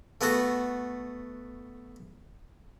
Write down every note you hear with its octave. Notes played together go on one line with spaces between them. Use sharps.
A3 B3 F#4 A4